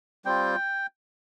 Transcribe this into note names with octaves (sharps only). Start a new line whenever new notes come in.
G3 C4 F4 G5